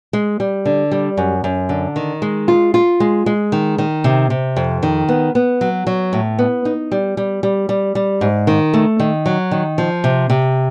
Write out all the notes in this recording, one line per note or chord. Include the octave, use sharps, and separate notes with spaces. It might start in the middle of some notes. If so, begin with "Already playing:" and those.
G#3
G3
D3
G3
F#2
F#2
D3
D#3
G#3
F4
F4
G#3
G#3
D#3
D#3
C3
C3
F2
D#3
B3
B3
F#3
F#3
A2
B3
D#4
G3
G3
G3
G3
G3
G#2
D#3
A3
D#3
F#3
D#3
F3
C3
C3